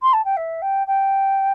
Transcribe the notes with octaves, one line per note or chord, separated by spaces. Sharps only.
C6
A5
G5
E5
G5
G5